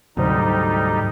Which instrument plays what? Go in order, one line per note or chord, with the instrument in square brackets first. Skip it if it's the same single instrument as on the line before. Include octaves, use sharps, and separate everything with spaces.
[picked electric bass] D2 [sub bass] G#2 [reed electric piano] C3 F#3 C5 [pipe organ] G3 D#4